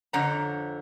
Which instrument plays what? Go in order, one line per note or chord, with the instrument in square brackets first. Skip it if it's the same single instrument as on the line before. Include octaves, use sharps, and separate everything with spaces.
[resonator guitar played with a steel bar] F2 D3 F3 C#5 F#5 A#5